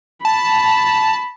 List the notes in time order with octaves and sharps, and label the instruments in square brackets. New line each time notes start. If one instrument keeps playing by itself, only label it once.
[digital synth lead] A5 [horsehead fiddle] B5